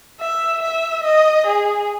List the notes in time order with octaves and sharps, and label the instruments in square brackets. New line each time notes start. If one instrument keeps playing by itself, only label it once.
[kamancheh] E5
E5
D#5
G#4